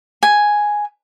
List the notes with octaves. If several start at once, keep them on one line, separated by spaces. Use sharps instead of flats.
G#5